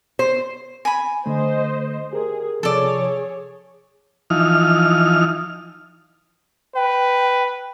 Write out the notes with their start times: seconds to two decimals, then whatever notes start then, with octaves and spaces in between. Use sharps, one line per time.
0.19 C5
0.85 G#5 B5
1.26 D3 A3 C5 D#5
2.13 G4 G#4 A#4
2.63 C3 F3 G#4 A4 C#5 D5
4.30 E3 F3 D#4 F6
6.76 B4 G5